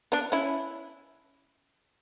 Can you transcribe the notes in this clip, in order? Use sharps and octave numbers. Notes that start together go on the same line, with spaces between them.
B3 D4
C#4 E4